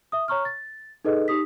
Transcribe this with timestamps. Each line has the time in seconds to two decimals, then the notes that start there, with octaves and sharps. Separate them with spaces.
0.12 E5 D#6
0.28 C#5 A#5 C#6 F6
0.45 A6
1.05 D#4 G#4 A4 B4 D#5
1.28 D#4 G4 D#6 B6